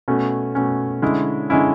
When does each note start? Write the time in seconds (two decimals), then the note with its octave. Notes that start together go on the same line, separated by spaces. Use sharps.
0.08 B2 A3 C#4
0.55 B2 A3 C#4
1.02 D3 G#3 C#4 E4
1.50 D3 G#3 C#4 E4